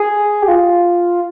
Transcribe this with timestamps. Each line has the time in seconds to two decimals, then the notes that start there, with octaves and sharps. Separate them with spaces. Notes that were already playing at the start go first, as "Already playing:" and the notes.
Already playing: G#4
0.42 G4
0.48 F4